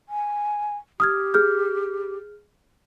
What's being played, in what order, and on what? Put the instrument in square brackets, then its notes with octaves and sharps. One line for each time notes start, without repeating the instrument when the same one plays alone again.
[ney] G#5
[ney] G4 [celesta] D#6 F6 G#6
[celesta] G#4 F6 G6